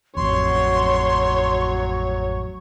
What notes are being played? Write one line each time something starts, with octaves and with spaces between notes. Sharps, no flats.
A1 F2 F#3 C#5 C6